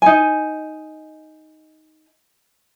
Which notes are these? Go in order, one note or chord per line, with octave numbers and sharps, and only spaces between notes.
D#4 G#5